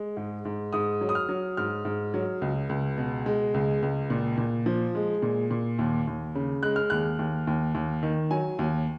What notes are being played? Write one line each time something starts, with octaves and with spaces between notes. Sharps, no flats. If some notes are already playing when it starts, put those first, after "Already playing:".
Already playing: G#3
G#2
G#2
G#2 D#6
F#3
D#6
F6
F#3
G#2 F6
G#2
F#3
C#2
C#2
B2
G#3
C#2
C#2
A#2
A#2
F3
G#3
A#2
A#2
D#2
D#2
C#3
G#3 F#6
F6
D#2 F#6
D#2
D#2
D#2
D#3
F#3 G#5
D#2